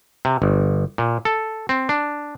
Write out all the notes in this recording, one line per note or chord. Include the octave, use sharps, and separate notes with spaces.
C3
G1
A#2
A4
C4
D4